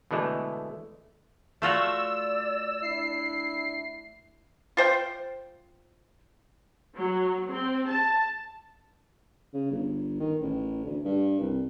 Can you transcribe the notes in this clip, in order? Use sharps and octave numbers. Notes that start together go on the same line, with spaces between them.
B2 D3 E3 G#3 A3
A3 F4 F#4 D5 E6
D4 E4 C7
F4 C5 G5
F#3
C4
A5
C#3
G1
D#3
A1
D2
G2
C2